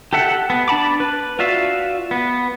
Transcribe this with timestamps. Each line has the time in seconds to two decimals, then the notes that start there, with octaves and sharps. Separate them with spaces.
0.13 G4 A4 E5 F#5
0.50 B3
0.68 D4 A5 B5 D6
1.00 B4
1.39 F4 F#4 D5 E5 F5
2.11 B3